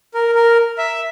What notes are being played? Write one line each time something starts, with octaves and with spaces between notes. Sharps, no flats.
A#4
A#4
E5